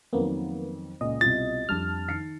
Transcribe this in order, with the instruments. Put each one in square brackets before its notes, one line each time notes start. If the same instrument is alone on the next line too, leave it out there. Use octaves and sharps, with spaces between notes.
[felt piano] F2 D#3 F#3 [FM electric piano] A#3 B3
[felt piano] C#2 A#2 [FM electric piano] D#5
[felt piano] C2 B2 F4 [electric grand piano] A6
[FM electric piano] F2 A5 F6 [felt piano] G3 D4 G4
[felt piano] D#3 C7 C#7